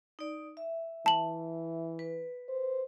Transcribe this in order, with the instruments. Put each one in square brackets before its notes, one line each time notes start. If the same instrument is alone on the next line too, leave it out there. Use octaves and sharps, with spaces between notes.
[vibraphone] D#4 D5
E5
[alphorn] E3 [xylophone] A5 F#7
[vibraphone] B4
[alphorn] C5